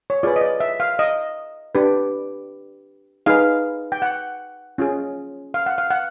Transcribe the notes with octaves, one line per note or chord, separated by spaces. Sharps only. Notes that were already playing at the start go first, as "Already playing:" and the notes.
C#5
F4 G#4 B4 D5
D#5
D5
E5
F5
D#5
D4 G4 B4
D#4 G#4 B4 F5
G5
F#5
C#4 F4 G#4
F5
F#5
F5
F#5